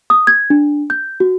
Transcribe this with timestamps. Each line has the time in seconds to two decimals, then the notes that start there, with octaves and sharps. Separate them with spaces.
0.10 D#6
0.27 G#6
0.50 D4
0.90 G6
1.20 F#4